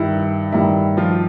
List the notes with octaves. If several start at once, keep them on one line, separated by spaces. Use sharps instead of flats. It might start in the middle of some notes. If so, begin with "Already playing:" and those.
Already playing: G2 D#3 E4
G2 D#3 E4
F3 F4